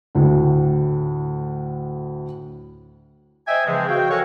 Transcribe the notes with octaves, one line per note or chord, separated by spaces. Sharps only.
D2 A2
C5 D#5 E5 G5 G#5
C#3 E3 F3 G#3 C4
F#4 F5 G5
A4 A#4 C#5 F#5 G#5